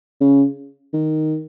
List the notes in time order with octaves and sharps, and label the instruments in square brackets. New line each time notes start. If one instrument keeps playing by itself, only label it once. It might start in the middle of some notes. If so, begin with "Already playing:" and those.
[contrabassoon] C#3
D#3